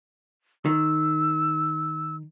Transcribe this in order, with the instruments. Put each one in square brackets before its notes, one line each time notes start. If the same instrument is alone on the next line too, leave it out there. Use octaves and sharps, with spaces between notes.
[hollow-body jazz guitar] D#3 [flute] E6